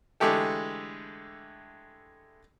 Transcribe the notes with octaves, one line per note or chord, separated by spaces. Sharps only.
D3 E3 G#3 A3 G4 A4